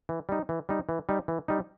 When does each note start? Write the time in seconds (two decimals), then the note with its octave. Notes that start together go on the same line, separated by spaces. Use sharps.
0.09 E3
0.29 G3 D#4
0.49 E3
0.69 G3 D#4
0.89 E3
1.09 G3 D#4
1.28 E3
1.48 G3 D#4